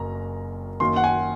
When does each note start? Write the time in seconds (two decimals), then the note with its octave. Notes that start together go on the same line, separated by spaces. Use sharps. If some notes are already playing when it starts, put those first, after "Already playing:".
Already playing: F#1 F#2 A#5
0.80 F#2 D#3 A#3 C6
0.96 F#5
1.04 G#5